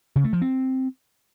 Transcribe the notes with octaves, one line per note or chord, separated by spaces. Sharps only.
C#3
A3
F3
C4